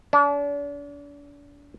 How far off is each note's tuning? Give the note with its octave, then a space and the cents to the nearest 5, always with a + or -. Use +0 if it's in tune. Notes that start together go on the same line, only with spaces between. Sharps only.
D4 -40